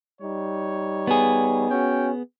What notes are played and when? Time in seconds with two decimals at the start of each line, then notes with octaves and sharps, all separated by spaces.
0.21 G3 D#4 C#5
1.07 B3 G#4
1.71 C#4 F#4 G5